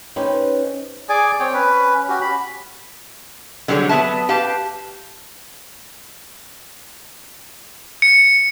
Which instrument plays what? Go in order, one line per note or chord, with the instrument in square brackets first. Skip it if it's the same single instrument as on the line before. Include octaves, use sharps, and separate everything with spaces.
[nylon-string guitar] C#4 D#4 G4 B4 C5 D#5
[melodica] G#4 D5 G#5 D6
C4 C#5 G5
C#4 B4
C#4 F#4 G4
B5
[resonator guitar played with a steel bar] D3 F#3 G3 G#4 C5 C#5
F#3 B3 B4 E5 A5
G4 B4 F5 A5
[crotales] C#7